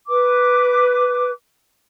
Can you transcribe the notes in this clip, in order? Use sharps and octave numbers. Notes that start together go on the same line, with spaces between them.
B4 D6